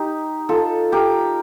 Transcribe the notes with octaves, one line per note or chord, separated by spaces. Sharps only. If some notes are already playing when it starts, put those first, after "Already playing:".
Already playing: D#4 G4
F4 A4
G4 A#4